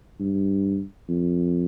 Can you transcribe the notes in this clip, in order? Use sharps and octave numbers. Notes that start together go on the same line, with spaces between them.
G2
F2